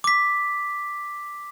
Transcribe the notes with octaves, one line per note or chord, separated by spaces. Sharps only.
D6 B6